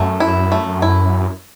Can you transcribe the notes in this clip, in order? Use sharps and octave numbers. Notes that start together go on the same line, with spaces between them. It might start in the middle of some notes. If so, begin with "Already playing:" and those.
Already playing: F#2 A3
E4
A3
E4